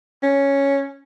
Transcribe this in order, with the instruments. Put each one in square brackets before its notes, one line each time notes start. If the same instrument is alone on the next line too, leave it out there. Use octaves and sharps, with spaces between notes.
[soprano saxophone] C#4